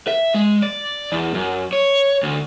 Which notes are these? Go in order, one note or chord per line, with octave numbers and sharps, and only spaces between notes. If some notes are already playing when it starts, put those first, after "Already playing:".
E5
G#3
D5
E2
F#2
C#5
D2